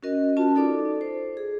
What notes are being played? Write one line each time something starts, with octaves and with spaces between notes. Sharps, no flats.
C#4 F#4 A#4 D#5
C#4 F4 F#4 A5
D#4 A4 D5 D6
C5
G#4